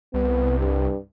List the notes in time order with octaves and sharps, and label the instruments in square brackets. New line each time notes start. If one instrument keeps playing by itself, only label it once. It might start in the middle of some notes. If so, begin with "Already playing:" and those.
[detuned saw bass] C2 [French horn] B3
[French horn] G2